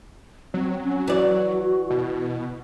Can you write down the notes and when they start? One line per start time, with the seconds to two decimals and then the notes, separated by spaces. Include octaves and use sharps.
0.54 F#3 C4
0.83 C#4
1.08 E3 F#4 D5
1.90 B2